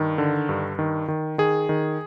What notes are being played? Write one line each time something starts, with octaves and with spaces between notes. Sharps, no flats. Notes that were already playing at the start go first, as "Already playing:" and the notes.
Already playing: G2 D#3
D3
G2
D#3
D#3
D#3 G#4
D#3